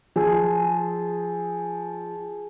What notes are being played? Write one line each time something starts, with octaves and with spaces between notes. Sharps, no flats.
F3 G#4 E6